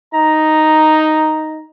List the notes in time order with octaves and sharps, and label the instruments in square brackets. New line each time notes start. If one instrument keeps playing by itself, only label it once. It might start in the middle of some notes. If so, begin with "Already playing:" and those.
[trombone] D#4 [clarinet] A#5